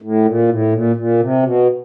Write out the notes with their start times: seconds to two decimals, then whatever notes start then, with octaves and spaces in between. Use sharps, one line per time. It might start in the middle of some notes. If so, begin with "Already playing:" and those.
0.02 A2
0.25 A#2
0.49 A2
0.73 A#2
0.96 A#2
1.19 C3
1.43 B2